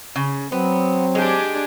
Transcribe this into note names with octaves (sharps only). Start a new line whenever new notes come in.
C#3
F#3 B3 C4
G#3 D4 G4 G#5